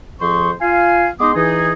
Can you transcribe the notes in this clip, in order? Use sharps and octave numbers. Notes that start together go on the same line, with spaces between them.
F2 F3 G#4 C5 C6 C#6
F4 F5 G#5
G#3 B3 D#4 C6 D6 D#6
E3 D#4 G#4